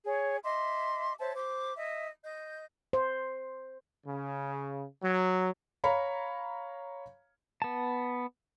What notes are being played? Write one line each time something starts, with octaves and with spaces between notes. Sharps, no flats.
G#4 C#5
D#5 E5 C6 D6
C5 C#5 E5 A5
C5 D6
D#5 E5
D#5 G6
C5
C#3
F#3
C#5 F5 A#5 B5
B3 A5